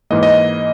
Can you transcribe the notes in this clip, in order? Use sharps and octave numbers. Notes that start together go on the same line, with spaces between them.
G#2 E3 A#3 D#5
D#5